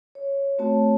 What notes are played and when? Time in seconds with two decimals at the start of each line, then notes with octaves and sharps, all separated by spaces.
0.15 C#5
0.58 A3 C4 F#4 C#5 A5